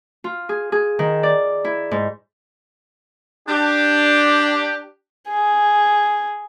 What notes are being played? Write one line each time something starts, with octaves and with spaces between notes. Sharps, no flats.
F4
G#4
G#4
D#3
D5
E4
G#2
D4 G4
G#4